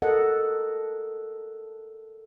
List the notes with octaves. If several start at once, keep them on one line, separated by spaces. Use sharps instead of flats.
A4 A#4 D#5 F#5